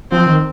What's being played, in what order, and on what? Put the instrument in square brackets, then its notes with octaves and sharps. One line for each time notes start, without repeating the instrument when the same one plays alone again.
[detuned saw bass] F3 [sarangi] C4
[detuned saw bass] D#3